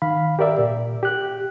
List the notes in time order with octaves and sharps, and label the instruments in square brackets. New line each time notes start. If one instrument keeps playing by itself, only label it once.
[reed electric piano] D#3 F5 B5
G4 A#4 D5 E5
A#2
G4 F#6